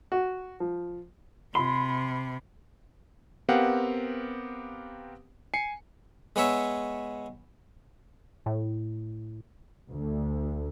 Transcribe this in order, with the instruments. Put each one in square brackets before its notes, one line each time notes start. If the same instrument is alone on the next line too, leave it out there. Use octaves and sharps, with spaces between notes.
[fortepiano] F#4
F3
[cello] C3 [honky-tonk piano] B5 [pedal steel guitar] C6
[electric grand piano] B3 C4 G4 A#4 F5 F#5
G#5 C7 C#7
[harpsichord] G#3 B3 C#5 E5
[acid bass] A2
[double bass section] D2